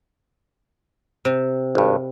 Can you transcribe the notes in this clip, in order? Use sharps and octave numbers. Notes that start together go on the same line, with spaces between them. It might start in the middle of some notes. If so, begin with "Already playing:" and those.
C3
G#1 G2